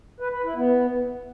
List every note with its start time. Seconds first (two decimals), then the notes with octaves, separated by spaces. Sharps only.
0.20 B4
0.32 B4
0.44 E4
0.56 B3